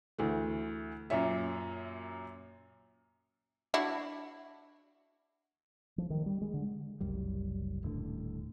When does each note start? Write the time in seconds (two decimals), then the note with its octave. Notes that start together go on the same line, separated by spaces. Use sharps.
0.19 D2 E3 A3
1.10 F#2 A#2 C#5 E5
3.74 D4 E4 F#4
5.98 F3
6.10 D#3
6.26 G3
6.41 G#3
6.54 D3
7.01 F#1 C2 F#2 G3
7.83 D#1 A2 D3